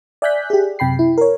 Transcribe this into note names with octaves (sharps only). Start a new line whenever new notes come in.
D5 E5 G#5 F#6 G6 B6
G4 G#4
F#2 C3 G5 B5 C7
E4
A#4 C#5